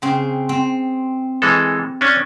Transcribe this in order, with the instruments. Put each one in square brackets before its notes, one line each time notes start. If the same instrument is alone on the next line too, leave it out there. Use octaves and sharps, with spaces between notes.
[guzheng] C#3 C4
C4
[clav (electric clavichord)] E3 G#3 A4
C#4 D4